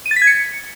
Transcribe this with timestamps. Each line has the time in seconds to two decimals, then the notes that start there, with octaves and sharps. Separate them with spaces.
0.06 D#7
0.11 A6
0.16 B6
0.22 G#6
0.27 C#7